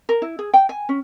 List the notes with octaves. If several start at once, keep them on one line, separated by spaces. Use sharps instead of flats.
A#4
E4
G#4
G5
G#5
C#4